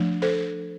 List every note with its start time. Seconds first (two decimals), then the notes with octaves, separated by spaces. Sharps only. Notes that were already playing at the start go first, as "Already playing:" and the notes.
Already playing: F3 A3 D4
0.22 A4 C5